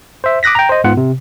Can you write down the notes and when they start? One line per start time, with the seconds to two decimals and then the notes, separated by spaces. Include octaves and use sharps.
0.24 C5 E5
0.43 D6 D#6 F#6 A#6 B6
0.55 G5 A#5
0.69 C5 D#5
0.84 G#2 B3 F4 F#5
0.97 C3